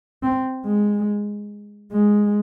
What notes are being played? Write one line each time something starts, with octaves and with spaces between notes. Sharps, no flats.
C4
G#3
G#3